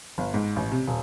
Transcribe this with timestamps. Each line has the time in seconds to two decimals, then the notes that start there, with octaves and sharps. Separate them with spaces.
0.18 G1
0.34 G#2
0.56 A1
0.72 C3
0.88 D#1